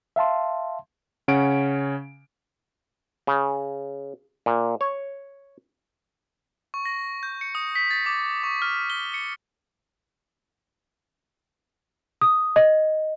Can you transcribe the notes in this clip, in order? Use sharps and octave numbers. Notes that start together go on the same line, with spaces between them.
E5 F5 A5 C6
C#3 C#4 F#5 C#6 D7
C#3
A#2
C#5
C#6
A#6
G6
C#7
D#6
B6
A6
D6
C#6
F6
G7
C#7
D#6
D#5